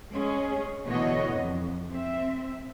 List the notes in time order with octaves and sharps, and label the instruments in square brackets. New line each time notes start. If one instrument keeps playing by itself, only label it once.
[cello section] G#3 C#4 G#4
B2 D3 E3 F#4 C#5 D#5
F2
C4 E5